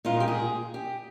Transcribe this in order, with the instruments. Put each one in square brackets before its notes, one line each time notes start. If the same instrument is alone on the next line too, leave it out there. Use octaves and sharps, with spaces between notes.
[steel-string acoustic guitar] A#2 G#3 F4
G4
G#4
G4